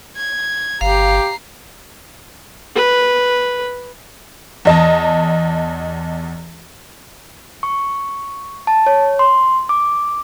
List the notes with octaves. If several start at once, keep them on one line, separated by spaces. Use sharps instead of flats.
G#6
G1 G4 F5 A#5 C7
B4
E2 D#5 A5
C#6
A5
C#5
C6
D6